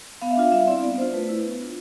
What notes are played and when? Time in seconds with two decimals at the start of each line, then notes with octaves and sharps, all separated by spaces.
0.22 B3 F5
0.31 E5
0.37 D4 F4 F5
0.52 G3 E5
0.67 C4 E4 D5
0.83 B3 D5
0.98 D4 C5
1.02 F4
1.13 A3 B4
1.29 E4
1.43 B3
1.59 D4 F4